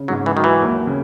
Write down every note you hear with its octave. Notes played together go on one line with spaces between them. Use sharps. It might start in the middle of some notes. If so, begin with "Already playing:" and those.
Already playing: C#3
G#2 F#3
E3
D#3 F#3
E3
D#2
C#3